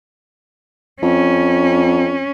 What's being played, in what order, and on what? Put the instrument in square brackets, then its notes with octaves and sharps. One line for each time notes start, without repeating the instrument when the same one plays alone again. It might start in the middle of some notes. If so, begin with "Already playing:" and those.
[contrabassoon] F2 [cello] C#4